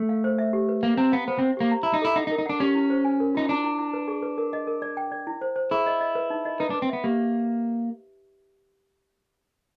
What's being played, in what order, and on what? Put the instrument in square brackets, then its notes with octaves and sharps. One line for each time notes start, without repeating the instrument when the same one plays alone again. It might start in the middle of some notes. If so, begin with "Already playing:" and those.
Already playing: [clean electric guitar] A3
[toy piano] F5
C5
E5
G4
B4
[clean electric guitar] A#3 [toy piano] F5
[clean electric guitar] C4 [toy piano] A#5
[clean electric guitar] B3 [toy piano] F5
[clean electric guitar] B3 [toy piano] C5
[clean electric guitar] C4 [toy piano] C5
[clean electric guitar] A#3 [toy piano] G4
[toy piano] A#5
[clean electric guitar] E4 [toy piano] A#5
[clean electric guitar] D#4
[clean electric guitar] E4 [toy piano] A4
[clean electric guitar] D#4 [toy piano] F#5
[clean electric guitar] D#4
[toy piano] A#4
[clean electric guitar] D#4
[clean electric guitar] D4 [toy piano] F#5
[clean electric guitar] C#4 [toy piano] G4
[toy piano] E4
C5
G#5
A#4
[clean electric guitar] D#4 [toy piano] F4
[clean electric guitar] D4 [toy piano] E4
[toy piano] E4
E4
B4
G#4
B4
A#4
D#5
A#4
D5
G5
D5
E4
C5
C5
[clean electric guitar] E4 [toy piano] G#4
[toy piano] D#5
D#5
B4
D#4
D#5
[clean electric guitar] D#4 [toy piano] B4
[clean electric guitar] D4 [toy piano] B4
[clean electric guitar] C4
[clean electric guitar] B3 [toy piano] E5
[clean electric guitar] A#3 [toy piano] G4